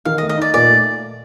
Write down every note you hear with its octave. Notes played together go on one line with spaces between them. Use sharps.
D#3 F5
D#5
A3
D#5
D#4 D5
A#2 D5
A3